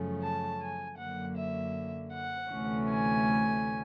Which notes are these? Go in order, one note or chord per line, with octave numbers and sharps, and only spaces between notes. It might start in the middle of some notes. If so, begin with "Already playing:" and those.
Already playing: F#2 C#3 F3 A3 C#4
A5
G#5
F#2 D3 F#3 A#3 F#5
E5
F#5
D2 C3 E3 A3 C#4
G#5